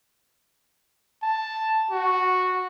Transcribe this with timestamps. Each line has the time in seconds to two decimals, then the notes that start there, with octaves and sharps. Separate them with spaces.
1.23 A5
1.91 F#4